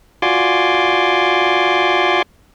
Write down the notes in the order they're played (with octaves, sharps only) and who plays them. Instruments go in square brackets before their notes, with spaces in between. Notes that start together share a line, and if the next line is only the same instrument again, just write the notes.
[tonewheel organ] F4 F#4 D5 G#5 C6 D6